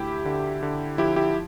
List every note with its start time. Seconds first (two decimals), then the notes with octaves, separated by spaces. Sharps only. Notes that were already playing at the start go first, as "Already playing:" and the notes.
Already playing: D2 E4 G4
0.25 D3
0.63 D3
0.98 F3 E4 G4
1.16 E4 G4